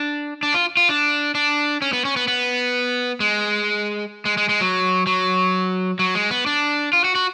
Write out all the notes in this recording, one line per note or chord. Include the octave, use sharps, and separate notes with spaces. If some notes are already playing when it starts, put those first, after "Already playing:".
Already playing: D4
D4
F4
F4
D4
D4
C#4
B3
C#4
B3
B3
G#3
G#3
G#3
G#3
F#3
F#3
F#3
G#3
B3
D4
F4
F#4
F#4